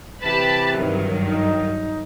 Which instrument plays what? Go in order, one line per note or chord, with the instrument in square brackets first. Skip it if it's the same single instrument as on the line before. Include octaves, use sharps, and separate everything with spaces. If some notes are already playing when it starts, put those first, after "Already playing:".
[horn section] C3 E3 B4 [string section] G4 A5 B5
[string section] G2 D#3 F#3
[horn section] D#4